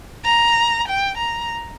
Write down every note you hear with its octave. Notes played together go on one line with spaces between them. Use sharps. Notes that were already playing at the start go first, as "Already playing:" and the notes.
A#5
G5
A#5